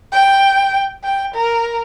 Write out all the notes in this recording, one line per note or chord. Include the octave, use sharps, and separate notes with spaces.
G5
G5
A#4